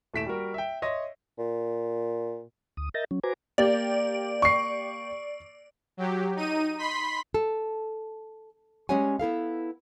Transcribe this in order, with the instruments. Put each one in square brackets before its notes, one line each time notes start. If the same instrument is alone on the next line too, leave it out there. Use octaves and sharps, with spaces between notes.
[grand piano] D#1 A3 E4 B6 D7 E7
G3 F#4 A#4
E5 G5
C#5 D#5 E5 C6 A#6
[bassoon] A#2
[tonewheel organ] D2 D#6
A#4 D#5 E5 G6 A6 A#6
F#3 C#4
F#4 B4 C5 G#5 A#5 D6
[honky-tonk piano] A#3 G4 [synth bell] D5
[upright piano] C#6 C7
[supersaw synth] F#3 G4
D#4 D#7
B5 C6 B6
[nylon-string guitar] A4
G3 G#3 C#4 C#5 F#5 G#5
B3 E4 A4 F5